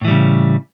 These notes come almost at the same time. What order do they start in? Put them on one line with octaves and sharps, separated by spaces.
A2 E3 G3 C#3